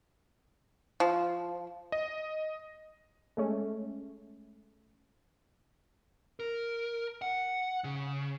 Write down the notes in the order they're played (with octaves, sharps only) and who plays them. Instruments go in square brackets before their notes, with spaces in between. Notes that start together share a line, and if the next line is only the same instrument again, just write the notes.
[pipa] F3
[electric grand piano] D#5
[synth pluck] G#3 A3 C#4
[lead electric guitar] A#4
F#5
C#3